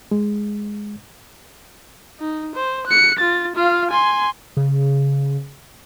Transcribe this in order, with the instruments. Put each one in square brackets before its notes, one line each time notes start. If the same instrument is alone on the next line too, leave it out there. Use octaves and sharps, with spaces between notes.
[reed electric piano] G#3
[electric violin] D#4
C5
F#6 C#7
F4 A6
F4 F5
G#5 C6
[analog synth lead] C#3